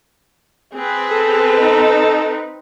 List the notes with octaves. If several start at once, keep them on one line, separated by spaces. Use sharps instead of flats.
C4 G#4 B4
A4
D#4